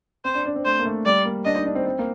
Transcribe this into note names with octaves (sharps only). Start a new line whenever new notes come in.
C4 C5
D4
D4
C4
A3 C5
A#3
A3
G3 D5
A#3
D4 D#5
D#4
D4
C4
C4
A#3